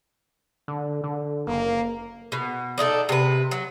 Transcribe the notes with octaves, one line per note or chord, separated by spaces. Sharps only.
D3
D3
F#1 A#3
B2
D4 D#4 F4 A4
C3 B4
F#3